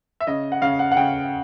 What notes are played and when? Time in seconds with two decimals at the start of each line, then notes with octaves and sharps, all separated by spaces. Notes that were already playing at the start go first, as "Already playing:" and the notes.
0.20 E5
0.27 C#3 D#5
0.52 F#5
0.62 C#3 F5
0.79 F#5
0.92 F#5
0.97 C#3 G5